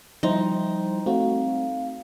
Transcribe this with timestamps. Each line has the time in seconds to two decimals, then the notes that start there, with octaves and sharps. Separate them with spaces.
0.23 F3 G3 D#4 E4 C5
1.06 A3 C4 F#4 F5